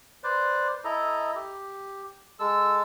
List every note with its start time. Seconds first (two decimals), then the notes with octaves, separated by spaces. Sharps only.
0.23 B4 C5 D5
0.84 E4 A4 D#5 A#5
1.35 G4
2.39 G#3 A4 E6